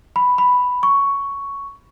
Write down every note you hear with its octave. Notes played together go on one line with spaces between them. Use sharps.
B5
B5
C#6